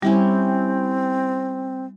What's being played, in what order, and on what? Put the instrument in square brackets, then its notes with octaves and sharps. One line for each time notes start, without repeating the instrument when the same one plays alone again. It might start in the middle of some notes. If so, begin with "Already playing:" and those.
[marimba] G3 [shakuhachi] C4 [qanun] C#4 E4 G4